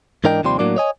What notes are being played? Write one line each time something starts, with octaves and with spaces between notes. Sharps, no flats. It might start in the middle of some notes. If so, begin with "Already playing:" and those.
G#2 E3 D4 A#4 D#5 G5
D#2 C3 F3 G3 C6
A2 F#3 A#3 D4 D5
C#5 D#5 G#5